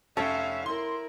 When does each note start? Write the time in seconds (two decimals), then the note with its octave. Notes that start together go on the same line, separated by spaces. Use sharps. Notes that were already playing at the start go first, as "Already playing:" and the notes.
0.17 F1 C#4 A4 C#5 E5 F5 G5
0.66 E4 A#4 C6